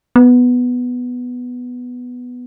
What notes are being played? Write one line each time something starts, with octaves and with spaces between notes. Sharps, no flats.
B3